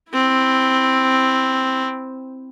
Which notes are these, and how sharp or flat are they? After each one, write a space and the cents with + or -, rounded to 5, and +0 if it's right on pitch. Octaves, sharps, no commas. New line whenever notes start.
C4 +0 E4 +0